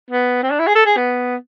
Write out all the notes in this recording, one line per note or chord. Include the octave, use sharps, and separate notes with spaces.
B3
C4
D4
E4
G#4
A4
G#4
B3